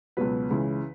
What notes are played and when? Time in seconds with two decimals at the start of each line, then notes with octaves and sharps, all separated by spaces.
0.17 C#2 B2 F#3 B4
0.51 C#2 C#3 E3